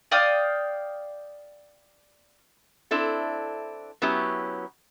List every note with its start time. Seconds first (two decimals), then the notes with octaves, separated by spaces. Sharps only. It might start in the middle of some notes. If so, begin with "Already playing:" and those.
0.11 D5 F5 G5 D#6
2.91 C4 D4 E4 A4
4.02 F#3 B3 C#4 E4 G4